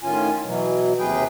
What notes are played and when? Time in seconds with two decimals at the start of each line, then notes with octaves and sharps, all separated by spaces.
0.03 A2 D#3 C#4 F4 G#5
0.45 B2 E3 F#3
0.98 D#2 C3 G#4 B4 G5